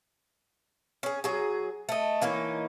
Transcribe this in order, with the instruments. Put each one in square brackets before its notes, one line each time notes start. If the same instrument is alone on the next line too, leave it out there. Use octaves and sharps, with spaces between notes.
[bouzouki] C#4 G#4
F#3 G#4
A3 D#5
E3 A#3 C#4 D#4